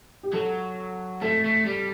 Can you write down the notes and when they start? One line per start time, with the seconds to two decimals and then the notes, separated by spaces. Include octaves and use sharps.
0.23 G4
0.33 F#3 A4
1.21 A3 A4
1.44 A3
1.66 G3